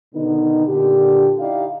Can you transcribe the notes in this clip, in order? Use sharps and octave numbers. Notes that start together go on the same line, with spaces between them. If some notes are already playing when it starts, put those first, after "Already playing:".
B2 D3 D#3 B3 D#4
A#2 D3 G4
D#4 E4 G4 D5 F5